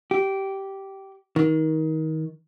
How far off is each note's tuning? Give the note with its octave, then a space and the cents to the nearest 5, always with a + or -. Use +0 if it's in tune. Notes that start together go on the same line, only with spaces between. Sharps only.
G4 -15
D#3 +25